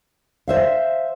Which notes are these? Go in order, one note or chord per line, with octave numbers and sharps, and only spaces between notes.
C5 E5 F5